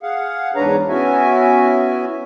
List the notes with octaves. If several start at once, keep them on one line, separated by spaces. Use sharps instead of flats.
G#4 F5 F#5
E2 G#2 D4 B4 C#5 A#5
B3 C#4 E4 F#4 E5 G#5